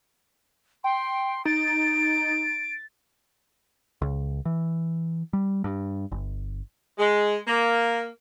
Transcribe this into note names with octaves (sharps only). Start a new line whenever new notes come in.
G5 C6
D#4 A6 D7
C#2
E3
G3
G2
G1
G#3
A#3